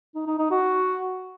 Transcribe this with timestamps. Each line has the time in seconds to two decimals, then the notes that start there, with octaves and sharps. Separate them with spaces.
0.15 D#4
0.27 D#4
0.39 D#4
0.51 F#4